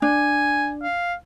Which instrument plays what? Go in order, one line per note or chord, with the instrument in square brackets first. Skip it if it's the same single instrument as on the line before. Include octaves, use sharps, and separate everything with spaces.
[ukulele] D4 [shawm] G#5
[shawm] F5